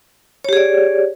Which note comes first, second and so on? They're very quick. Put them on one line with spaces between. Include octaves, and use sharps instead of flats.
C#5 G4 G#4 D5